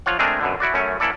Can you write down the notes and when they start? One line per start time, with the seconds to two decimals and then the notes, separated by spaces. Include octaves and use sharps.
0.06 F3 F4 C#5 F#5
0.19 G#3 A3 C4 D4 G#4 A#4
0.41 F#2 B2 D3
0.60 E4 F#4 D5
0.74 F#2 A3 C#4
1.00 E3 A#3 E4 A4 D5